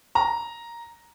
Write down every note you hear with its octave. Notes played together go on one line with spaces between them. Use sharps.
A#5